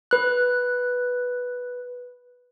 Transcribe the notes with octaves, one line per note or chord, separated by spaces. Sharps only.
B4 F#6